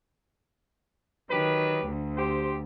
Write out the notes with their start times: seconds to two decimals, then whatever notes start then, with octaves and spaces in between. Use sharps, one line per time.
1.31 D#3 F#3 G4 B4
1.87 D2
2.17 G4 C5